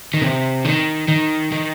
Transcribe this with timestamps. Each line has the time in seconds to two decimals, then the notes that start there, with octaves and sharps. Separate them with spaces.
0.14 D#3
0.22 C3
0.65 D#3
1.08 D#3
1.52 D#3